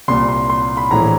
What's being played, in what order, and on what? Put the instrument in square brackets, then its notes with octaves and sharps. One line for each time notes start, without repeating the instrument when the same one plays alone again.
[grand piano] C2 A#2 C6
C6
C6
B5
A#1 A2 E3 A#5